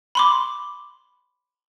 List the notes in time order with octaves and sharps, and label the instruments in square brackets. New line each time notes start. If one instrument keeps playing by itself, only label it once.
[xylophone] B5 C6 D6